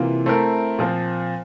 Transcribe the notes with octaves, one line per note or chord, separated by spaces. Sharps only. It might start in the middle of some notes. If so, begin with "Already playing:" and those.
Already playing: C3 E3 A#3 F4
A3 C4 E4 A#4
A#2 F3 C4